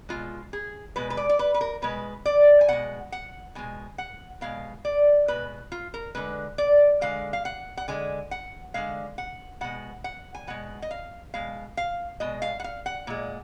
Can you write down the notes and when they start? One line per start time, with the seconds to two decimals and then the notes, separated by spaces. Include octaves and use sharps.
0.09 B2 G#3 F4
0.53 G#4
0.96 B2 G#3 B4
1.10 B4
1.17 D5
1.29 D5
1.39 B4
1.54 B4
1.61 A#4
1.82 B2 G#3 B4
2.26 D5
2.61 G#5
2.68 B2 G#3 F#5
3.12 F#5
3.55 B2 G#3 G#5
3.98 F#5
4.41 B2 G#3 F5
4.85 D5
5.28 B2 G#3 B4
5.72 F4
5.94 A#4
6.15 D3 G#3 B4
6.58 D5
7.01 D3 G#3 F5
7.33 F5
7.45 F#5
7.77 F#5
7.88 D3 G#3 G#5
8.31 F#5
8.74 D3 G#3 F5
9.18 F#5
9.61 B2 G#3 F#5
10.04 F#5
10.35 G#5
10.47 B2 G#3 F#5
10.82 D#5
10.91 F5
11.34 B2 G#3 F5
11.77 F5
12.20 B2 G#3 D#5
12.42 F5
12.60 F#5
12.64 F5
12.86 F#5
13.07 A#2 G#3